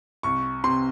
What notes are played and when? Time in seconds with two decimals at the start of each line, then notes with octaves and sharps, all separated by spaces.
0.23 C2 C#6
0.64 C3 C6